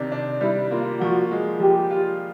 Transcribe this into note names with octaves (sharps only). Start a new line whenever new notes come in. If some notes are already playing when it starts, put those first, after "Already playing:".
Already playing: C3 D#3 D4
D4
G3 E4
A#3 F4
F3 F#4
G#3
F3 G4
F4